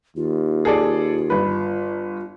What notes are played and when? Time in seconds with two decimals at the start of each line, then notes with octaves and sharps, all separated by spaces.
0.17 D#2 F4
0.65 G#4 A4 D5
1.30 G1 B4